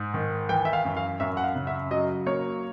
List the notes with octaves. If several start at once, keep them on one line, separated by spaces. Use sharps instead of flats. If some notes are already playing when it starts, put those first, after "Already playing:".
Already playing: G#2
D#3
E3 G5
E5
F5
F#2
F5
F#2 E5
F#5
F5
C#3
E5
F#3 D#5
A#3 C#5